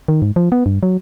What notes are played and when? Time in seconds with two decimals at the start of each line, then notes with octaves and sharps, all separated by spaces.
0.08 D#3
0.22 G#2
0.36 F3
0.52 B3
0.66 G2
0.83 F#3